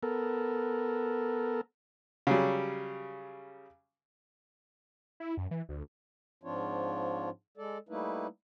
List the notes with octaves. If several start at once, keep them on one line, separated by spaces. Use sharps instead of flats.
B3 A4 A#4
C#3 F#3 G3
E4
F#2
E3
D2
G#2 F3 C4 D4 F4 C#5
G#3 A4 D5
G3 A3 A#3 D#4 E4 B4